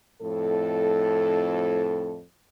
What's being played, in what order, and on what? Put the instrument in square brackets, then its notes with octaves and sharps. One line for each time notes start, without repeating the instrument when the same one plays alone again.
[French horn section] F2 A2 A4